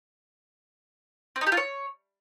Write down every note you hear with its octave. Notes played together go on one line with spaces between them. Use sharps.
C4
D#4
G4
F4
C#5